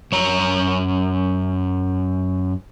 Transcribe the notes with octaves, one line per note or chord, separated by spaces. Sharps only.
F#2 C#5 A#5